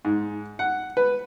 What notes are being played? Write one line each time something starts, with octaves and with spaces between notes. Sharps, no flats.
G#2
F#5
B4